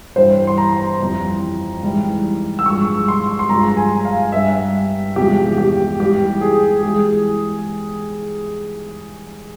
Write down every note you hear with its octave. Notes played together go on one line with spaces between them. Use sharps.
G2 E3 G3 C5
C6
A#5
F2 E3 G3
G#2 E3 G3
E6
G2 F3 G#3 C#6
C6
C6
G2 F3 G#3 A#5
G#5
F5
G2 G3 E5
E2 C3 F3 G#3 G4
G4
G#2 E3 G3 G4
G#4
E3 G#3 G#4